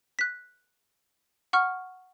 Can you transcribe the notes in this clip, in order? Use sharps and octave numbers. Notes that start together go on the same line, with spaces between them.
F#6 B6
F#5 C#6 F6